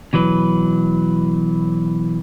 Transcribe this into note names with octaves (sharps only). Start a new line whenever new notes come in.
B2 E3 F#3 B4